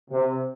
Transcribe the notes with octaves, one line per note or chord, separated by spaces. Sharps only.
C3